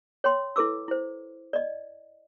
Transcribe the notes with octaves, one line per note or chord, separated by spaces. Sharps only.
C#5 G5 C6
E4 A4 B4 D6 E6
E4 C5
D5 D#5